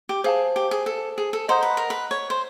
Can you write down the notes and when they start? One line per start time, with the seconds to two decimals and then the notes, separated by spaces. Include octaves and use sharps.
0.09 G4
0.24 G#4 C5 F5 A5
0.56 G4
0.71 G#4
0.86 A4
1.18 G#4
1.33 A4
1.48 C5 D#5 F#5 A#5 D#6 G6
1.63 B4
1.77 A#4
1.90 B4
2.11 C#5
2.30 C5